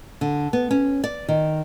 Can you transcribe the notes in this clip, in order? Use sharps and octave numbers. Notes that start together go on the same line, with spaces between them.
D3
B3
C#4
D5
D#3